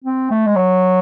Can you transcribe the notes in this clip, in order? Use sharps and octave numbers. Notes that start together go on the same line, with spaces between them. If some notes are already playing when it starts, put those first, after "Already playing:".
C4
A3
G#3
F#3